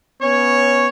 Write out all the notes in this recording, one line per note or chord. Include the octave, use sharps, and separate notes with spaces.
B3 C#4 C#5